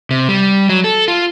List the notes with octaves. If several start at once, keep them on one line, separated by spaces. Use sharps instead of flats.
C3
G3
F#3
A4
F4